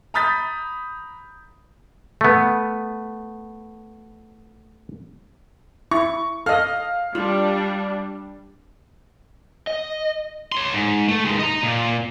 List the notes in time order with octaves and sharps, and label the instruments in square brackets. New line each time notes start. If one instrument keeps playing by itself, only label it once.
[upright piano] A#5 B5 D#6 G6 A6 B6
[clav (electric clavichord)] A3 B3
[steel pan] E4 [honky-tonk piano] C#6
[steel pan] A4 D#5 [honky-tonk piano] F5 F6
[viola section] G3 D4 [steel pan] F4
[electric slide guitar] D#5
[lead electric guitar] C#5 C6
G#2
A3
D#2 G#3
D#5 A#5
A#2